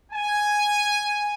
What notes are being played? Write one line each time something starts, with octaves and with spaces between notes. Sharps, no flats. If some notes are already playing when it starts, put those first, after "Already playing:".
G#5